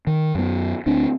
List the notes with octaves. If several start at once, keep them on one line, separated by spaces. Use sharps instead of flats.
D#3
F#2 B3
D2 C4 D4